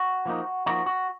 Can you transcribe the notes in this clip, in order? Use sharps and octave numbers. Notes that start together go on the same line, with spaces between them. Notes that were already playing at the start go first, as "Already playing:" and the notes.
Already playing: F#4
F3 A#3 D#4
F3 A#3 D#4 F#4
F#4